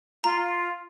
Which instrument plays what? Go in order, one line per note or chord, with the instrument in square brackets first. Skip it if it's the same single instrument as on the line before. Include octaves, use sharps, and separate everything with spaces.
[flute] F4 [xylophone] A#5